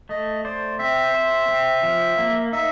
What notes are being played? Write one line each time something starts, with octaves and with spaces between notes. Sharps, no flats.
A3 D#5
C5 D5
C4 E5
C5
C4
F3
A#3
D#4 E5